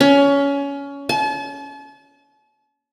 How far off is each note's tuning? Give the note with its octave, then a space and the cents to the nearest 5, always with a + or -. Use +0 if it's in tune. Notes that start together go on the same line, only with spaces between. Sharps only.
C#4 +20
A5 -40